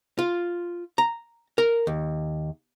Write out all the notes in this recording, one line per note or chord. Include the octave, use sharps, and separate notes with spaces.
F4
A#5
A#4
D#2